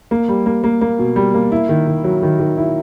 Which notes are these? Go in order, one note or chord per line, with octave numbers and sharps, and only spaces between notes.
A#3
G3
A#3
A#3
A#3
B2
G3
A#3
E4
D#3
D#3
F#3
D#3
D#3
E4